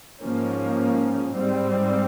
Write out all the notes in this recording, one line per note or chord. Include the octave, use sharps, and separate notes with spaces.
G#2 F3 A#3 C#4
G#2 G3 C4